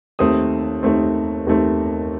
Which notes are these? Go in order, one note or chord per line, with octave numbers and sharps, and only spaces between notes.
D#2 D#3 A3 C4 D#6
D#2 D#3 A3 C4
D#2 D#3 A3 C4